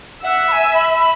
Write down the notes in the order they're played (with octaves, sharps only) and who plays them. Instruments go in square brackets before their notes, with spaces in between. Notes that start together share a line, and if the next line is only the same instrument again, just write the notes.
[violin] E5 [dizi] F#5
[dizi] B5
G#5
B5
B5